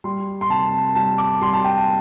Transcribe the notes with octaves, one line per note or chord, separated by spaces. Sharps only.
G3 C6
C6
C3 A5
G3 A5
D6
G3 C6
A5
G5